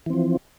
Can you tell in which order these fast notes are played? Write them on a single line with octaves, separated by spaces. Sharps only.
E3 C4 F3